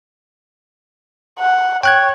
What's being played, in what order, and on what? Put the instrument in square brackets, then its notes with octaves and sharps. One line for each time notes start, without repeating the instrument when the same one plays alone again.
[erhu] F#5
[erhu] C#5 [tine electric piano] G5 F#6 G#6